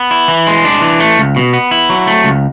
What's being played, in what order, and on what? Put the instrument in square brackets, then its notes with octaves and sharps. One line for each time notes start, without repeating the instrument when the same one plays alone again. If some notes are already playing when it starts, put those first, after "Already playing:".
Already playing: [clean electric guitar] B3
E4
E3
G#3
D4
E3
A3
C#2
B2
B3
E4
F#3
A3
C#2